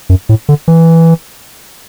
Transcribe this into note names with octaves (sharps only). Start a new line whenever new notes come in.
F#2
A2
D3
E3